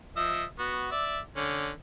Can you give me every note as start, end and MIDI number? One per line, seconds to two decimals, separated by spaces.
0.16 0.44 53
0.16 0.44 75
0.16 0.44 76
0.59 0.88 59
0.59 0.88 66
0.91 1.19 74
0.91 1.19 76
1.36 1.69 50
1.36 1.69 61